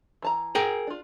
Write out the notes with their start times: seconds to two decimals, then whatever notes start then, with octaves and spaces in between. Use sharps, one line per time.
0.22 E3 A5 A#5
0.55 G#4 A#4 G5
0.87 D4 F4